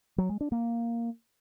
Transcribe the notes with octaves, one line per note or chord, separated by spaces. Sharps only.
F#3
G#3
D4
A#3